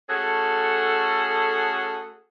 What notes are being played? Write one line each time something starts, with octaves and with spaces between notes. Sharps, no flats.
A3 C#4 F#4 G#4 A4